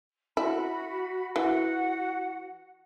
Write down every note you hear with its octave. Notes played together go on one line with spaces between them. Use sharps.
E4 F#4 B5
E3 F#4 F#5